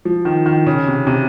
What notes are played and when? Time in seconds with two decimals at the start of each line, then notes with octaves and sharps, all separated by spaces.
0.05 F3
0.25 D#3
0.46 D#3
0.67 C#3
0.87 C3
1.07 C3